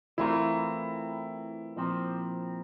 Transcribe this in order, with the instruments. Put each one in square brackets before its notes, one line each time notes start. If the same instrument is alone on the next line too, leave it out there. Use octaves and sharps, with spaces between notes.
[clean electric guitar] E3 A3 C4 F4 A#4 [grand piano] E4
[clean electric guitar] A#2 F3 C4